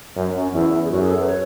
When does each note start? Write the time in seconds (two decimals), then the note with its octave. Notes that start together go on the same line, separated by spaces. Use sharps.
0.16 F#2 C#4
0.35 C#4
0.54 E2 E4
0.85 G#4
0.91 F#2 F#4
1.00 G#4
1.10 A4
1.20 B4
1.28 C#5